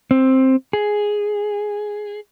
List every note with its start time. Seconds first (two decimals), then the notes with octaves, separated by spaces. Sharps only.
0.11 C4
0.73 G#4